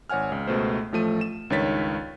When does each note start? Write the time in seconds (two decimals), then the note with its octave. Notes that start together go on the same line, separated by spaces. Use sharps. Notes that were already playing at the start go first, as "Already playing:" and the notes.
0.10 G#1 C#5 F#5 G#5 F6
0.32 C#2
0.47 C#2 B2 A3 C5
0.92 A1 F3 A3 D#7
1.21 E7
1.50 C#2 G2 D#3 C#5 A6 B6